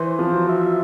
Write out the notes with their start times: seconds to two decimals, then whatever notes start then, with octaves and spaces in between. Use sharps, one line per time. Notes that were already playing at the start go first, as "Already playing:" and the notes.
Already playing: E3 C5
0.19 F3
0.33 F#3
0.49 E5